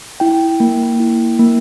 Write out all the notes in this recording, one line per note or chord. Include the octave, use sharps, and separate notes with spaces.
E4 G5
A#3
E4
A#3